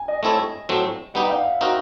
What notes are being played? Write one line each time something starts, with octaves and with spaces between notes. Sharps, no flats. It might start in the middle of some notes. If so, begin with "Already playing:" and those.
Already playing: G#5
D#5
A3 C4 E4 A4 C#5
A2 F#3 A3 C4
G3 B3 D#4 G4 F#5
F5
E5
C4 D#4 F#4 A#4